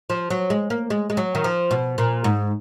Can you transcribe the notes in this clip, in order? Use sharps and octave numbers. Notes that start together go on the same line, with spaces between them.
F3
F#3
G#3
A#3
G#3
G#3
F#3
D#3
F3
B2
A#2
G#2